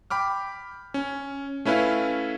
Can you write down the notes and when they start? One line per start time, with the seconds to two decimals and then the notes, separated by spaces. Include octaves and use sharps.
0.10 G5 B5 D6 F6
0.94 C#4
1.65 A3 C#4 E4 B4 F5